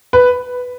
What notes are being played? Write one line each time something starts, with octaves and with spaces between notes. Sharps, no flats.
B4